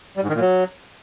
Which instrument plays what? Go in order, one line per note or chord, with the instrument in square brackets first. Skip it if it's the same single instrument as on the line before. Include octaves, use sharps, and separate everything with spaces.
[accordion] G3
G#2
D#3
A#2
F#3